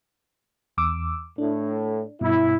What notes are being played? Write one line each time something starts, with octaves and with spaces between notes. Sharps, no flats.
E2 D6 E6
A2 D4
G2 B2 E4